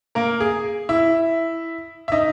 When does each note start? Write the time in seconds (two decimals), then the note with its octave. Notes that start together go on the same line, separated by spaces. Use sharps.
0.15 A#3 A#4
0.40 G#4
0.89 E4 E5
2.08 E5
2.12 D#4 D#5